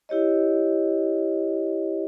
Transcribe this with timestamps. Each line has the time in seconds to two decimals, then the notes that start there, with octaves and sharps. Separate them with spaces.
0.09 E4 G4 C#5 D#5